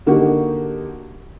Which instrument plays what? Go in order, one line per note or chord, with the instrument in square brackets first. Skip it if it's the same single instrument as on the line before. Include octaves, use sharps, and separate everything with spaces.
[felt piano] D3 A#3 D#4 F#4 G4